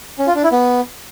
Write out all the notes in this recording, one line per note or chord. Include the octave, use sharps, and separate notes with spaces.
C#4
F4
D4
E4
B3